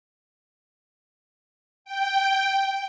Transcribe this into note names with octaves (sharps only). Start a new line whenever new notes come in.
G5